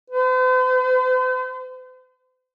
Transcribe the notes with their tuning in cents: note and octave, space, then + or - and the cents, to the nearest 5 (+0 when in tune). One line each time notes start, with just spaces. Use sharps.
C5 -45